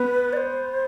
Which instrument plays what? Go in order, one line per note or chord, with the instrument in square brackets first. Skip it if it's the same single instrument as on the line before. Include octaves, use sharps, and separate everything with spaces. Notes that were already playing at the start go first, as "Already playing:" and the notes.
Already playing: [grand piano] B3 [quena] B4
[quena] D5
C5